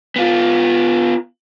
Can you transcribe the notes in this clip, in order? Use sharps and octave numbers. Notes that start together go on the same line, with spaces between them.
B3 F4